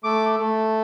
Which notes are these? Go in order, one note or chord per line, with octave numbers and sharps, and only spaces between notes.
A3 D6
A3